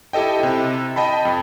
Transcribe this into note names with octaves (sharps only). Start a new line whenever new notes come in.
E4 G4 A4 D#5 G5
C3 E4
D#5 G5 A5 B5
F2